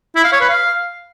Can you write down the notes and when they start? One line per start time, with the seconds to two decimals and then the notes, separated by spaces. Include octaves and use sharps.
0.16 E4
0.24 F5
0.32 C#5
0.41 B4
0.49 F5